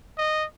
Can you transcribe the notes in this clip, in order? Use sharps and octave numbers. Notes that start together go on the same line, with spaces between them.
D#5